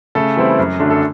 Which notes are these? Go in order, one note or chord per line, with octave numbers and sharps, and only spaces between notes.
C#3 A3 A4
E3 G3 C4 E4
F#2
D3 F#3 A3 D4
A4